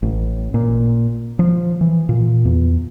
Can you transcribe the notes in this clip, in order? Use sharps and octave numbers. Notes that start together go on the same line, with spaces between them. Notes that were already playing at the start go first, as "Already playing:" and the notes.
A1
A#2
F3
E3
A#2
E2